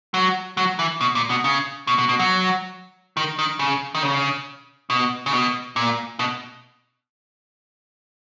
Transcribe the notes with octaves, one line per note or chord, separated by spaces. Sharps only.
F#3
F#3
E3
B2
A#2
B2
C#3
B2
B2
B2
F#3
D#3
D#3
C#3
D#3
C#3
B2
C#3
B2
A#2
B2